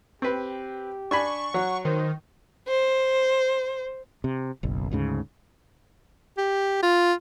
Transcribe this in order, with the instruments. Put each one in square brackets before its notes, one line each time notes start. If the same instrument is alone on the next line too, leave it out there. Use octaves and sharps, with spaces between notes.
[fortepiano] C4 B4 [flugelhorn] G4
[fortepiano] D4 G#5 B5 [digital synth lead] C#6
[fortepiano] F#3 [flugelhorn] F#5
[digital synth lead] D#3 [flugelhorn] C5
[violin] C5
[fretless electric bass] C3
F#1 B1
D2 G#2 C#3
[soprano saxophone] G4
F4